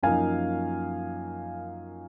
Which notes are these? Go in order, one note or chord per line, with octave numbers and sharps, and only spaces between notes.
F#2 F3 A#3 D#4 F5 G#5